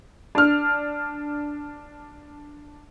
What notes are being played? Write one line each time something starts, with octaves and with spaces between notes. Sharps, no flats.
D4 F6